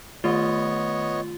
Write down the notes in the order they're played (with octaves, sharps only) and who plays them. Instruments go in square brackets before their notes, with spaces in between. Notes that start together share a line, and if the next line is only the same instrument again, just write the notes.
[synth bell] D#3 A3 [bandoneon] B3 C#5 D#5 [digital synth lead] F4